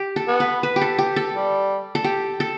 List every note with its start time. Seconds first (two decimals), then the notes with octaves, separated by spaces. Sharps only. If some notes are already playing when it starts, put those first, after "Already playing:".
Already playing: G4
0.16 A4
0.28 B3
0.40 B4
0.63 B4
0.76 G4
0.81 A4
0.98 G4
1.16 A4
1.34 G3
1.95 A4
2.04 G4
2.40 A4